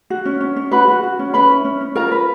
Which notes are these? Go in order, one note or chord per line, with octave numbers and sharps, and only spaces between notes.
F#4
C#4
C#4
C#4
F#4 B4 B5
F#4
F#4
C#4
C#4 B4 B5
E4
C#4
C#4
F4 A#4 A#5
B4